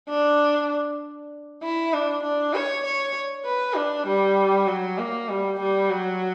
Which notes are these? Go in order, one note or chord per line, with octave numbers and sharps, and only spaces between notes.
D4
E4
D4
D4
C#5
C#5
B4
D4
G3
F#3
A#3
G3
G3
F#3